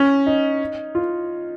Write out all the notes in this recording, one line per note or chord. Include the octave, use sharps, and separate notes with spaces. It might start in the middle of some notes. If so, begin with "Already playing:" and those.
Already playing: C#4
D#4
F4